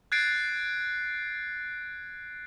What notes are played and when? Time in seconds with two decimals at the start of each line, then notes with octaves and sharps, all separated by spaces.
0.12 F#6 G#6 A6 C7 D7